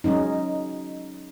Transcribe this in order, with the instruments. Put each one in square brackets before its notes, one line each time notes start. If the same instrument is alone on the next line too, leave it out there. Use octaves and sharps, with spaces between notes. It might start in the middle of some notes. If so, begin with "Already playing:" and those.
[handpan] F#3 G#3 C#4 D#4